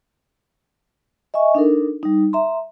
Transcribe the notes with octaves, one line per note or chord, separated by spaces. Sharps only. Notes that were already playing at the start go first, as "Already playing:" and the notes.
D#5 E5 G#5 C#6
D4 D#4 A4 A#4
G3 D#4
E5 A#5 C6